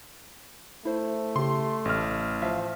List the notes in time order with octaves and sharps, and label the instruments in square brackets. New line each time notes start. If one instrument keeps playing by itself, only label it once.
[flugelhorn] A3 [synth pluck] E4 C5
[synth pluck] C#3 G4 [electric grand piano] C6
[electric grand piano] A1 F6
[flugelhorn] F3 [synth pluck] E5 F5